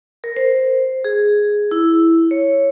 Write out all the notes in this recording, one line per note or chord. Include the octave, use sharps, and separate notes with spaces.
A#4
C5
G#4
E4
C#5